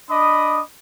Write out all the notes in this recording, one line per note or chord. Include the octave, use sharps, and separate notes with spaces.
D4 D#5 B5 D6 D#6